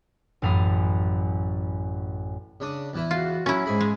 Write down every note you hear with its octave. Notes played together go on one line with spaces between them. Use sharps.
A1 F#2 F5 A5 B5 D#6
C#3 D4 D#6
E2 E3 E4
F4 F#4
F#3 C#4 E4 F#4
G#2 G#4 G#5 B5
G#3